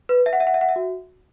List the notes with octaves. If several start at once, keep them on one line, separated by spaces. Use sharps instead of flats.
B4
E5
F#5
E5
F#5
E5
F#5
E5
F#4